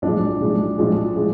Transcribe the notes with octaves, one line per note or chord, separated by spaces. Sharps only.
B1 A2 F3 G#3 D4
B1 A2 F3 G#3
B1 A2 F3 G#3
A2 F3 G#3